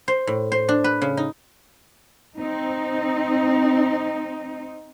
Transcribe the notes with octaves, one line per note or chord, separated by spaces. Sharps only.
C5
A2
C5
D4
B4
C#3
D#4
C4 D#4